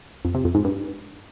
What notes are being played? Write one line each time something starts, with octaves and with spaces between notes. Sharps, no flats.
F2
C3
F2
G#2
G2